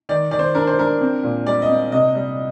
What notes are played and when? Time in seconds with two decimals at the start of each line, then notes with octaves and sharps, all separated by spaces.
0.09 D#3 D5
0.31 D#3 D5
0.39 C5
0.55 D4 A#4
0.67 C5
0.78 D4 A#4
1.01 C4
1.23 A#2
1.46 G3 D5
1.62 D#5
1.69 C4
1.92 C3 D#5
2.15 G3